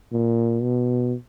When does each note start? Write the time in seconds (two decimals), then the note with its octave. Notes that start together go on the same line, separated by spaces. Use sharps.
0.13 A#2
0.62 B2